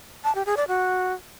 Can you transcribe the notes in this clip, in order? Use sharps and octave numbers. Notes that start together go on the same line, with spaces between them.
A5
G4
G#4
D5
F#4